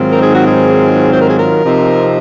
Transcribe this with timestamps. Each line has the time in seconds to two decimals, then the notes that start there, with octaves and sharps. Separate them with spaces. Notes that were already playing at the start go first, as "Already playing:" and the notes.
Already playing: G#2 D#3 F#3 C4 F4
0.11 A#4
0.22 G#4
0.34 F#4
0.46 G#4
1.11 C5
1.20 A#4
1.28 G#4
1.37 A#4
1.63 C3 F3 C4 D#4